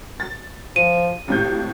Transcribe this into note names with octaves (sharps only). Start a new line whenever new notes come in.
A6
F3 D#7
G#1 A2 G4 G6